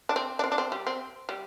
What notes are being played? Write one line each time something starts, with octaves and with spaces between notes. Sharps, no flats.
D4
C4
D4
C4
D4
C4
G3
C4
G3